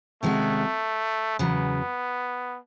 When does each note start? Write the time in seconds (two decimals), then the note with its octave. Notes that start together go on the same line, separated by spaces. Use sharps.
0.23 C3 D#3 G#3 A3 C#4 F#4
1.39 E2 C#3 F#3 B3